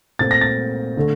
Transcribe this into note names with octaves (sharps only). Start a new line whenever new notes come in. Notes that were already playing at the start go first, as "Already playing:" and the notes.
A#2 A3 C4 A6
A#6
A6
D3 A3